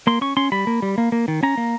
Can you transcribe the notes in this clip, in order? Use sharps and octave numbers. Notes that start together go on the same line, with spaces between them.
A#3 C6
C#4 C#6
C#4 C6
G3 B5
A#3
G3
A#3
A#3
D#3
C#4 A#5
A#3